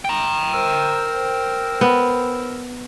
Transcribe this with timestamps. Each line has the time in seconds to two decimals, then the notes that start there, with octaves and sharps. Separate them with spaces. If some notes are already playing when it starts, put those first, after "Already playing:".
0.05 G5 A#5
0.53 A#4 C5 E6
1.81 B3